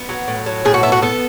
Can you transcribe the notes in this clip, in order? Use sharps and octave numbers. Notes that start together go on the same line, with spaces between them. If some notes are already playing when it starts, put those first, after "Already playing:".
Already playing: B3
F#3
A2
F#3
A2 G#4
F#4
B3 E4
F#4
B3 A4